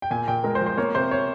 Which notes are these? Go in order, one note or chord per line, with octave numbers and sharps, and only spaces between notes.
G5
A#2 G#5
A#2 G5
G#3 A#4
C5
F3
C5
A#3 C#5
C3 C5
C#5